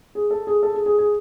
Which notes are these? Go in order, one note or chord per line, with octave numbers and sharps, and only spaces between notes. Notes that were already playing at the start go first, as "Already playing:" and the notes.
G#4
A4
G#4
A4
G#4
G#4
G#4